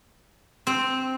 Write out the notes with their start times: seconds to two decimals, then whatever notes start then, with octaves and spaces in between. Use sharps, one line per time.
0.67 C4